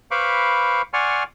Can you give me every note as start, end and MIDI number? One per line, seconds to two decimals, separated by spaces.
0.11 0.82 71
0.11 0.82 72
0.11 0.82 77
0.11 0.82 83
0.11 0.82 85
0.11 0.82 86
0.93 1.24 74
0.93 1.24 78
0.93 1.24 80
0.93 1.24 84
0.93 1.24 85
0.93 1.24 89